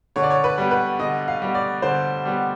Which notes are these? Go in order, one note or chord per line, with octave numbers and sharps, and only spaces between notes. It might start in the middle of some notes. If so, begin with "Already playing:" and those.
D3 C#5
D5
C#5
B4
G3 B3
B4
D3 D#5
F5
G3 B3
D5
D3 C5
G3 B3